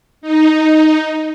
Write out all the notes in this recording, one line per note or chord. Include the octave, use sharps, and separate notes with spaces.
D#4